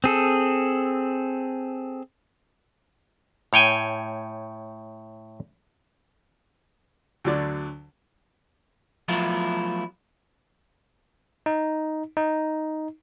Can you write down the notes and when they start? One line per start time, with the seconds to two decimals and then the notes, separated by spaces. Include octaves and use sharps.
0.04 C4 G#4 A4
3.53 A2 C#5 G5 G#5
7.24 D2 D3 F#3 D5
9.08 F3 F#3 A3 B3 E4 F4
11.46 D#4
12.17 D#4